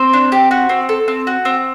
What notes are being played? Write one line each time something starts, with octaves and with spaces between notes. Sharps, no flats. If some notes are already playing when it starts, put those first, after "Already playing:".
Already playing: C4 C5
D4
G4
F#4
C4
A4
C4
F#4
C4